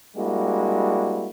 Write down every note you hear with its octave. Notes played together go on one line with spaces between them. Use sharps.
G3 G#3 A#3 D4 E4 F#4